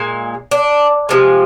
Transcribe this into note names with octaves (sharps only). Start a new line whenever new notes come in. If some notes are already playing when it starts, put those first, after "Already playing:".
Already playing: A#2 G#3
D4
C3 F3 G#3